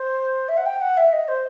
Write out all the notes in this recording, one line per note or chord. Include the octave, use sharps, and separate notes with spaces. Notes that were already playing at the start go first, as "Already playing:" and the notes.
Already playing: C5
E5
F#5
G5
F#5
E5
D#5
C5